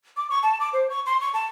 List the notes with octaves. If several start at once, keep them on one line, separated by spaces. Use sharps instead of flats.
D6
C#6
A5
D6
C5
C#6
C6
C#6
A5